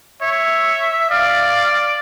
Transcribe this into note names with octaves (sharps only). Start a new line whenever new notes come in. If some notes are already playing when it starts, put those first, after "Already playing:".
C#5 E5
D5 F5